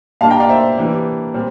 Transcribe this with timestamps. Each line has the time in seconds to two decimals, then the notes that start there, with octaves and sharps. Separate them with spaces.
0.21 A#2 G3 A#3 D4 F5 A5
0.30 G5 A#5
0.40 D5 F5
0.49 C5 E5
0.77 E3 G3 A#3 D4
1.34 A#2 G3 C4